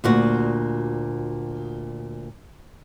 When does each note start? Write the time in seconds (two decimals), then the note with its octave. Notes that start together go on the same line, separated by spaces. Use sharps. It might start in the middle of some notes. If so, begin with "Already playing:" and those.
0.04 D2 A#2 F#4